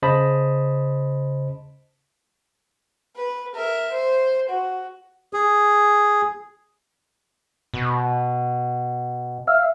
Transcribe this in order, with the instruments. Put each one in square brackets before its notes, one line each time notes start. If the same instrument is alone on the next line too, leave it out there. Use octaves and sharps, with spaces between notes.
[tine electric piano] C#3 C5 D#5 A5 B5 D#6
[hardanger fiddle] B4
A#4 E5
C5
F#4
[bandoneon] G#4
[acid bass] B2
[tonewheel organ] E5 F5